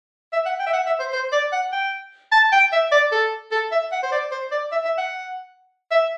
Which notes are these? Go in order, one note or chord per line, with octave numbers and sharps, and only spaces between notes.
E5
F#5
G5
E5
F#5
E5
C5
C5
D5
F#5
G5
A5
G5
E5
D5
A4
A4
E5
F#5
C5
D5
C5
D5
E5
E5
F#5
E5